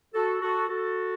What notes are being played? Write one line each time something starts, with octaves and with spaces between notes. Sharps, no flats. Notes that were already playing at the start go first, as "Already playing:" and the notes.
F#4 A4
F#4 A4
F#4 A4